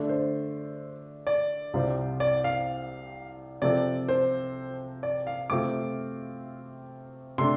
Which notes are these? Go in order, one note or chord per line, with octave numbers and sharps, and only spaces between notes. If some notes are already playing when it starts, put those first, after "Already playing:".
Already playing: D3 A3 D4
C5
D5
C2 C3 G3 F4 C5
D5
F5
C3 F3 C4 A4 D5
C5
D5
F5
C3 A3 C4 F4 D6
C3 A3 D4 C6